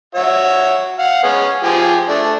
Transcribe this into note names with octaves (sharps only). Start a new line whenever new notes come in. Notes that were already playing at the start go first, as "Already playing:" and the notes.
F#4 C#5 E5
F5 F#5
G#3 B3 C#4
F3 G4 G#4
A3 D4